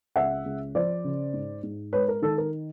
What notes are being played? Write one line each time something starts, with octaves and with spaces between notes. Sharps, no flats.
C#2 E5 F#5
C#2
F3 C5 D5
C#3
G#2
G#2
G#3 B4 C#5
A#4
D#3 A4
A#4